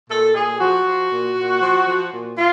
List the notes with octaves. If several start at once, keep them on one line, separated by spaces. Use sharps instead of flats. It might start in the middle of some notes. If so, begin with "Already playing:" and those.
A#2 A4
A#2 G#4
F3 F#4
F3
A#2
A#2
F3
F3
A#2
F4